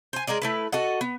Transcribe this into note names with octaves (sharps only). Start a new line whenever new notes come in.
C5 G#5
G#3 A#4 D5 D#5
A3 E4 B4
F#4 A4 D#5 F#5
B3